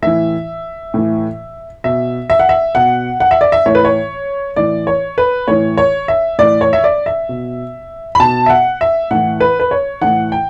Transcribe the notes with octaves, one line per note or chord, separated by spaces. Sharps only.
A2 E3 E5
A2 E3
B2 E5
E5
F#5
E5
B2 F#5
F#5
E5
D5
E5
A2 E3 C#5
B4
C#5
A2 E3 D5
C#5
B4
A2 E3 C#5
C#5
E5
A2 E3 D5
C#5
E5
D5
E5
B2
B5
B2 A5
E5
F#5
E5
A2 E3 F#5
B4
B4
C#5
A2 E3 F#5
G5